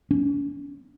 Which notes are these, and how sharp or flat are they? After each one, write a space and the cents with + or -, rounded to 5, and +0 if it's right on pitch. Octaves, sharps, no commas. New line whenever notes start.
C#4 +45